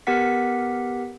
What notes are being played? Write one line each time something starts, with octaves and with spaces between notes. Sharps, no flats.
B3 G4 A#4 F#5 B6